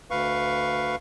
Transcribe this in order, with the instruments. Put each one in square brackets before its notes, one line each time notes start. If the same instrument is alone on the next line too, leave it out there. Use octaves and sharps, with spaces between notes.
[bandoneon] D2 B4 F5 C#6